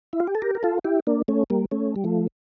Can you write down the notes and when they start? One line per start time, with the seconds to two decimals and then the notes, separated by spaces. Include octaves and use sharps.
0.13 E4
0.20 F4
0.27 G4
0.35 A4
0.42 G4 A#4
0.55 A#4
0.63 F4 A4
0.84 E4 G4
1.07 A#3 D4
1.28 A3 C#4
1.50 G3 A#3
1.71 A3 C#4
1.96 G3
2.04 F3 A3